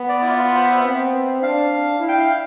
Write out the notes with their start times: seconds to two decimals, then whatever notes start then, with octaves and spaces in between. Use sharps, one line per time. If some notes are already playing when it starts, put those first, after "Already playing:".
Already playing: B3
0.09 D5
0.22 E4
0.27 F4
0.42 F4
0.56 C5
0.70 E5
0.84 C4
1.42 D4 F5
2.00 E4
2.08 G5
2.19 F5